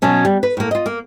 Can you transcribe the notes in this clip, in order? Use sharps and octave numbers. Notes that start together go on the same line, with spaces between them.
B2 F#3 C#4 A5
G3
B4
A2 A#3
F4 D#5
A#3